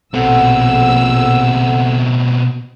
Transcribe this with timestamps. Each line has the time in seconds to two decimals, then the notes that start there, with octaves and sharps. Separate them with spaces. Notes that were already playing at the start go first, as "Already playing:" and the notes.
0.14 A#1 B2 C4 A4 F#5 E6